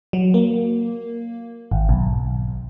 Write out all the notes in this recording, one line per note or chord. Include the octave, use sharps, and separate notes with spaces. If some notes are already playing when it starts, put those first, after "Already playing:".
F#3
A#3
G#1
B1